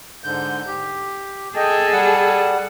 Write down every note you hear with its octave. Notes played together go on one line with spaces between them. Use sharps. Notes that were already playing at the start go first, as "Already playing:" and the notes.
G#2 D3 G6
G4
G#4 A4 D#5 G5
G3 F#5